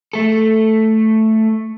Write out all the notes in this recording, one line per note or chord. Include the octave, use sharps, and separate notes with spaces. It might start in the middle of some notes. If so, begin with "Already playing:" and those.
A3 A4